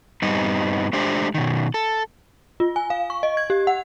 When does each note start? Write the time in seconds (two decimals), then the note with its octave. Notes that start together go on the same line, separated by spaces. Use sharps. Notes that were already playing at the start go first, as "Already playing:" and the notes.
0.22 G2 G3 B3 C4 D#4
0.93 G#3 A3 D4 G4 C5
1.34 B2 D#3
1.74 A4
2.60 F4
2.76 G#5
2.90 F5
3.10 C#6
3.23 D#5
3.37 G#6
3.50 G4
3.67 F#5